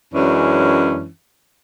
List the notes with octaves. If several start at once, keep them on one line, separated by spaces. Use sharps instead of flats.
F#2 E3 G#3 C#4 D4